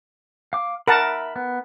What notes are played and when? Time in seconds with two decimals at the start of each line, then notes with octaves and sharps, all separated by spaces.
0.53 F5 D6
0.88 A#4 E5 F#5 A5 B5
1.36 B3